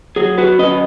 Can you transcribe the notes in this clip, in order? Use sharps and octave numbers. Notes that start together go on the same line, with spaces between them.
F#3 G#4
F#4 B4
C#4 B4 D#5